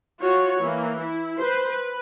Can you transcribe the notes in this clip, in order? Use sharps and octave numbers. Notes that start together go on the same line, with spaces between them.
F4 F#4 C#5
E3 A#3
E4
B4 C5
B4